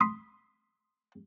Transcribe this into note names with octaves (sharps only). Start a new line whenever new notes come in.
B5 C6 D#6